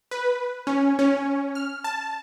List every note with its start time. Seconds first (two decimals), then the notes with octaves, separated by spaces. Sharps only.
0.11 B4
0.67 C#4
0.99 C#4
1.55 F6
1.84 A5